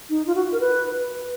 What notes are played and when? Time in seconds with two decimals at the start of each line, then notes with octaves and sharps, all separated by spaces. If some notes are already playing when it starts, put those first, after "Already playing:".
0.10 D#4
0.27 F4
0.35 F#4
0.52 A#4
0.60 B4